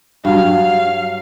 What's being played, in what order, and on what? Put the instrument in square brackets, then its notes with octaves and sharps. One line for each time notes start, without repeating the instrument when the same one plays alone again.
[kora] G2 F#3 [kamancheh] F5